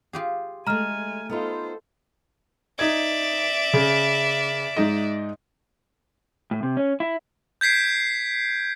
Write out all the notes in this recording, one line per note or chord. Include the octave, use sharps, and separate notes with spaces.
F4 G4 G#4
G#3 A3 G#5 A#5 F6
B3 D#4 F4 A4 C5
D#4 D5 E5 G#6
C#3
G#2 D#4 D#5
A2
C3
C#4
E4
G6 G#6 B6 C7 D7